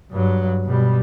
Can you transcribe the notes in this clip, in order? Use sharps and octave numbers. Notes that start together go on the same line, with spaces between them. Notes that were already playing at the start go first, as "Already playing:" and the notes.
G2 F#3
B2 G3